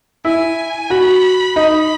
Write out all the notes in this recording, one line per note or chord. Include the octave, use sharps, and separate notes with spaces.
E4 G#5
F#4 B5
D#4 B5